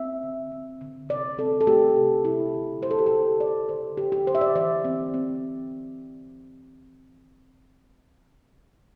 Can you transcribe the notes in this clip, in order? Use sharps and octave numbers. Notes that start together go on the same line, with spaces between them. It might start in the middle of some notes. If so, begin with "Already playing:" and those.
Already playing: C4 E5
D3
C4
D3
C3 D5
C4 A4
A4
A3 G4
C3
E4
D3
E4 C5
A4
G4
A4
D3
D3 D5
D3 C5
D3 G4
G4
D3 C5
E5
D5
E3 D5
C4
C4